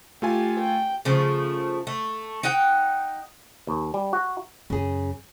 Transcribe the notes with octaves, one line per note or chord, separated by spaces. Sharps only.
A3 F4 G4 G#5
G5
C#3 F3 A3
A3
D#4 D#5 F#5 G5
D#2
G3
F#4
F#2 C#3 G#4